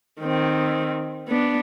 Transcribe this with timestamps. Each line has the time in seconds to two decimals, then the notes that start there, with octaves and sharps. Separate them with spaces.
0.21 D#3 C4
1.28 B3 D4